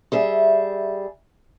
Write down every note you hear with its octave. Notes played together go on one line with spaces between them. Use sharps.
G3 G#4 E5